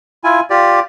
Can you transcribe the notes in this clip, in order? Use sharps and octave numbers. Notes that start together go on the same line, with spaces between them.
E4 F4 G#5
F4 G4 D5